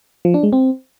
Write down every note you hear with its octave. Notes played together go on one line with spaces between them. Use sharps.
F3
D4
G#3
C4